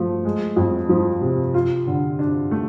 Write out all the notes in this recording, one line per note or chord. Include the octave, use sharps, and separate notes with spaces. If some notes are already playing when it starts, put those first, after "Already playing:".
Already playing: F3 A3
G#3
F2
F3
C3
F4
D3
D4
A3